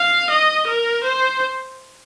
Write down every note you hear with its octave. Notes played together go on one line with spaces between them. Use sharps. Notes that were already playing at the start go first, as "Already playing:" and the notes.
Already playing: F5
D#5
A#4
C5